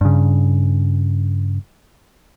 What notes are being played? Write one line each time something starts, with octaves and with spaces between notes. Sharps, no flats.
G2 C#3